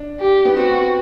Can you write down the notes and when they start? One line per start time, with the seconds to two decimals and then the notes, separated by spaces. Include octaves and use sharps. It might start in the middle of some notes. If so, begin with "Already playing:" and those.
Already playing: D4
0.20 G4
0.45 B3
0.56 C4 F#4